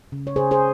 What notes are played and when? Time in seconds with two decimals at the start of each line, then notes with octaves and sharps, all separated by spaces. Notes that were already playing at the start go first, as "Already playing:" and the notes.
0.12 C#3
0.27 C#5
0.36 C#3 G#4 C5
0.51 G#4 C5